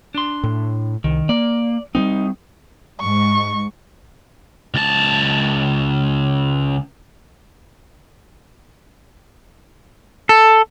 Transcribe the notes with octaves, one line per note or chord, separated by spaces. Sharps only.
D4 C6
A2
C2 D#3
A#3 D5
G3 A3 C4 D#4
G#2 C#6
C#2 A5
A4